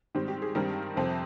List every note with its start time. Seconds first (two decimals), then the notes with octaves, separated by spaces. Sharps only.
0.15 G#2 D#3 G3 C4 G4
0.28 G4
0.42 G#4
0.55 G2 D#3 G3 C4 A#4
0.96 F2 C3 F3 C4